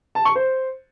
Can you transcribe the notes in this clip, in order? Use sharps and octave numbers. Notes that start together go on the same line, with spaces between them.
A5
C#6
C5